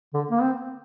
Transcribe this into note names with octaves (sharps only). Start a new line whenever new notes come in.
D3
A#3
C4